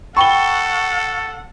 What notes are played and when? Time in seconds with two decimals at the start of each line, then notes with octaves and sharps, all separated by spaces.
0.17 A4 F#5 G5 B5 C#6 G7